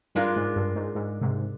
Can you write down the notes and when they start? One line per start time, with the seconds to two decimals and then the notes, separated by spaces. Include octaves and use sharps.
0.15 G2 G#3 D4 F4 A#4
0.36 G#2
0.56 G2
0.76 G#2
0.95 G#2
1.21 G#2 C3